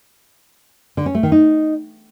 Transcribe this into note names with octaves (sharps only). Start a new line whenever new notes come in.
D3
C#4
A3
D#3
D#4